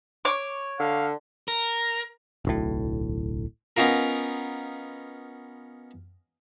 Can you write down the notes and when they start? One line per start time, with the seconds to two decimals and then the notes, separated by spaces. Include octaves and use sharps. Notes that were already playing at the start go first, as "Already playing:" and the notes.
0.25 C#5 D6
0.79 D3 F5
1.48 A#4
2.45 D1 B1 A2
3.77 B3 C#4 D#4 F4 A#4